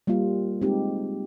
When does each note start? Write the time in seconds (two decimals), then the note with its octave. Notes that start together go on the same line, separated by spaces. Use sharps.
0.07 G3 A#3 F4
0.61 G#3 C4 D#4 G4